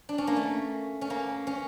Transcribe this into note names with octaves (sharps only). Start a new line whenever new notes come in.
D4
C#4
A#3
A3
C#4
A#3
C#4